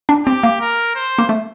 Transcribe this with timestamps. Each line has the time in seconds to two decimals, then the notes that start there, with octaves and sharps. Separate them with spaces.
0.09 D4
0.26 C4 G4
0.43 A#3
0.61 A#4
0.95 C5
1.19 A#3
1.29 A3